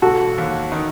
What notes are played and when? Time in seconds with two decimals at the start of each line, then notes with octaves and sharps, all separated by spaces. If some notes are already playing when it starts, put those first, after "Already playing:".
0.02 E1 F#4 A4
0.38 D#2
0.72 D#3